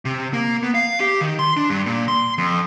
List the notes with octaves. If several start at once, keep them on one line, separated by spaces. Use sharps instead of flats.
C3
A#3
B3
F5
G4
D#3
C6
D4
G2
A#2
C6
F2